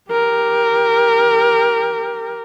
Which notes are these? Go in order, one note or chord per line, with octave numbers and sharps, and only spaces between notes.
G4 A#4